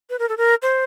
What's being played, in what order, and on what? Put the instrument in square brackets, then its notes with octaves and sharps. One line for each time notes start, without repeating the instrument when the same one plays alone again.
[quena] B4
A#4
A4
A#4
C5